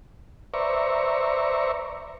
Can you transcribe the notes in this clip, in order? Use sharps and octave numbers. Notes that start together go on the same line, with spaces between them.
B4 C5 D5 E5 A#5 C#6